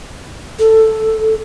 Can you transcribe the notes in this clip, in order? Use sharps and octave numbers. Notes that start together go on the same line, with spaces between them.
A4